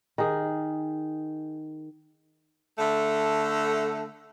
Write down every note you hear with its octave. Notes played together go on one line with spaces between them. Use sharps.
D#3 G#4
D3 A3